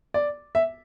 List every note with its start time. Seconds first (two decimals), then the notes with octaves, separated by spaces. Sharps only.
0.14 D5
0.55 E5